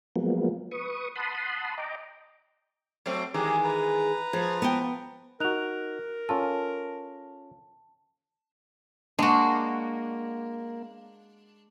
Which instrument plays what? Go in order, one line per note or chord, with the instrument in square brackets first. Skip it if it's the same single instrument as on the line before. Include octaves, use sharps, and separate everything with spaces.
[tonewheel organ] F3 F#3 G#3 A#3 B3
B4 C#6 D#6
F#5 A5 B5 C6 D#6
D#5 G5 A#5 D6
[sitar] F#3 A3 C4
[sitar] D#3 E3 G#3 [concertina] G4 G#4 A#5
[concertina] B4 A#5
[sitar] F3 [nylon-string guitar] G#4
[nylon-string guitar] B3 G5
[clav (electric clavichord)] D#4 F#4 [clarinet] A#4 [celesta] F#6 F7
[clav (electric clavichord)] C#4 F4 A4 [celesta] A5
[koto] G#3 F#4 [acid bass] A#3 [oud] D4